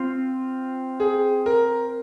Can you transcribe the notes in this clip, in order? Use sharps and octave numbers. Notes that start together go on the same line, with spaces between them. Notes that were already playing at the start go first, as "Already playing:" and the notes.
Already playing: C4 F4
G#4
A#4